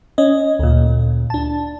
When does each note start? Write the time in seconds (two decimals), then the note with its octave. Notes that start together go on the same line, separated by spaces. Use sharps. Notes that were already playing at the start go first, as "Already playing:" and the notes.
0.18 C#4 D#5
0.59 D2 A#2
1.30 D4 A5